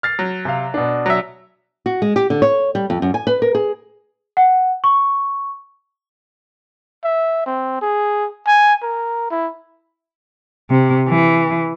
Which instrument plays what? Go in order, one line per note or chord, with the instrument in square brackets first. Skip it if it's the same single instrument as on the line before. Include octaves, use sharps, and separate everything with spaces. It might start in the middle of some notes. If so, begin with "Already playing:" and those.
[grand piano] F6 A6 C7
[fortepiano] F#3
[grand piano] C3 F5
B2 D4
[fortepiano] F#3 E5
[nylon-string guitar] F#4
G#3
G4
D3
C#5
G3
F2
F#2
G#5
B4
A#4
G#4
[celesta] F#5
C#6
[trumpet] E5
C4
G#4
G#5
A#4
E4
[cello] C3
E3